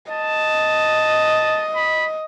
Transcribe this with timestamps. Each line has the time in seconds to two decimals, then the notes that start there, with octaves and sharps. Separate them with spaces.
0.11 D#5 A5
1.76 B5